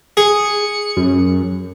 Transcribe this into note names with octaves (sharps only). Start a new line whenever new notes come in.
G#4 C#7
F#2